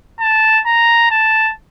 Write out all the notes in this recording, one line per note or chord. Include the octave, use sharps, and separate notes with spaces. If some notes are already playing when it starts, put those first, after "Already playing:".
A5
A#5
A5